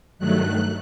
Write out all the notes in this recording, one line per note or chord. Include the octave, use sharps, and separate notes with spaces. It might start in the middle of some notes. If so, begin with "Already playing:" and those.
G2 D#3 F#3 A3 F#6